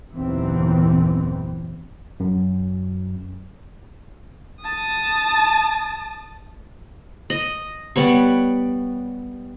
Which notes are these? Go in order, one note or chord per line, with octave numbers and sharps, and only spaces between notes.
F#1 D#2 A#2 E3 B3 C4
F#2
A5 D#6
D#5
G3 B3 C#5 C#6